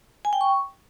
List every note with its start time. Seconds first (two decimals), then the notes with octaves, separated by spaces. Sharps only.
0.25 G#5
0.33 G5
0.41 C#6